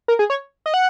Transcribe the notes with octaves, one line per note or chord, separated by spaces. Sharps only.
A#4
G#4
C#5
D#5
F#5